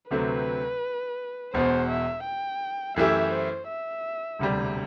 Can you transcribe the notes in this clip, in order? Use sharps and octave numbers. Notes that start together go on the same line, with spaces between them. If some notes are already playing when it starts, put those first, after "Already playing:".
D2 C3 F#3 A3 C4 B4
E1 E2 B2 C5
E5
G5
F#2 E3 A3 E4 G4 E5
C5
E5
E1 D2 C3 G3